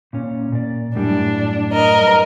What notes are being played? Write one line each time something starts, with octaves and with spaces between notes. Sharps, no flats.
A#2 C#4
A#2 D5
F#2 A2 G3 D4
A#4 D#5